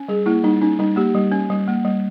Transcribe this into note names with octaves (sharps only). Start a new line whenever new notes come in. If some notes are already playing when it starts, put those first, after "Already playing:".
Already playing: C#4
G3 G#4
A#3 E4
G3 D#4
C#4 D#4
G3 D#4
A#3 G4
G3
C#4
G3
A#3
G3